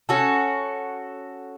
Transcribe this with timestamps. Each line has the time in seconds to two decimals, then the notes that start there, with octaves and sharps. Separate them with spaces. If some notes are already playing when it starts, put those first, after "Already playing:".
0.09 C#4 F#4 A4